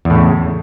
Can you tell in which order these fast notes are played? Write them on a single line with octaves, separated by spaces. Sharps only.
E2 A2 C#3